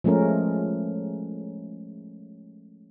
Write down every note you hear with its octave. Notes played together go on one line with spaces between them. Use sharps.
F3 G#3 A3 C#4 A#4